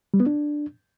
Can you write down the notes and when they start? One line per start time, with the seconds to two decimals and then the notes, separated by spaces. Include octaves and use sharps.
0.14 G3
0.20 B3
0.26 D4